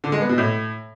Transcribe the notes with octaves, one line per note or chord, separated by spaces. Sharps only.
D3
G#3
B3
B2
A2